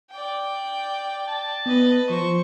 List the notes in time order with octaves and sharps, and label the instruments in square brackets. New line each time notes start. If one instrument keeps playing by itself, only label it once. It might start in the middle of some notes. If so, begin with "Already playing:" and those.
[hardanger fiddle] D5 G5
[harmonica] A5
[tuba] B3 [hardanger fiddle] B4 D#5
[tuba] F3 [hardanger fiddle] C5 C#6